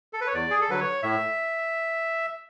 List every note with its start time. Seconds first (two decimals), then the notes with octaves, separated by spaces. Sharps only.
0.13 A4
0.21 B4
0.27 C#5
0.34 E2 D5
0.51 G#4
0.61 A4
0.69 D3 F#3 B4
0.80 C#5
1.03 A2 E5